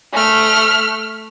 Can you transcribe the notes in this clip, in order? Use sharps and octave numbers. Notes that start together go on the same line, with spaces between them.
A3 F6